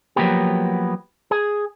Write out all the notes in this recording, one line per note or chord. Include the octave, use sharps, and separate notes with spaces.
F3 F#3 A#3 B3 G4
G#4